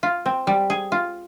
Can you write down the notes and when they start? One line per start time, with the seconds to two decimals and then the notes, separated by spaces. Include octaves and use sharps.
0.03 F4
0.26 C4
0.47 G3
0.70 G#4
0.92 F4